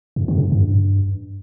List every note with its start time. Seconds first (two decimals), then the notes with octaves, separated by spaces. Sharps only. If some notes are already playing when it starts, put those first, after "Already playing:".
0.16 F#2
0.28 C#3
0.40 F#2
0.52 G2